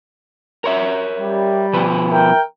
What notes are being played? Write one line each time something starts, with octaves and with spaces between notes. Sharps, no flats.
A#4 C#5 E5
G3
B2 F3 B4
A#4 E5 G5